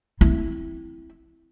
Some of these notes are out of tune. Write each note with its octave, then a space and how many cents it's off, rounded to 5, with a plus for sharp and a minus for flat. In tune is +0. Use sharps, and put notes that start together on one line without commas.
C4 +0 E4 +0